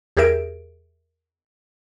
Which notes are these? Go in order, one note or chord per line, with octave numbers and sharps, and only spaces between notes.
E2 G4 G#4 A#4 E5 D7